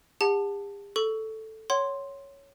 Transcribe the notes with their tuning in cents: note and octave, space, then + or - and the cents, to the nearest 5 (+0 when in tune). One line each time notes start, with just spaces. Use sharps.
G4 +45 F#5 -5 A5 +0
A4 +0 C#6 +15
C#5 +0 F#5 +30 C6 +0